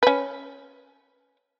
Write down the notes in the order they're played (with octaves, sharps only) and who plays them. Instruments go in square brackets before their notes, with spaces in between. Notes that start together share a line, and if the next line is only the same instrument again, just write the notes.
[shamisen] C#4 B4